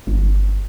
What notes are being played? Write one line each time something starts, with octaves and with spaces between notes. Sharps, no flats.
G1